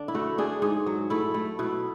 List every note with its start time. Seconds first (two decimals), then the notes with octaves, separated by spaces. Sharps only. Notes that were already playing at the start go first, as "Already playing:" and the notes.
Already playing: D3 D4
0.08 E4
0.15 A3 F#4
0.38 D4 G#4
0.62 G#2 G#4
0.87 F#3
1.10 A3 E4
1.34 A3
1.59 B2 E4